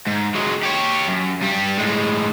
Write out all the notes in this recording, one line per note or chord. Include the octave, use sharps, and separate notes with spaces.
G#2
F#3 G#3
G4 C#5
F#2
G2 G3
A2 G#3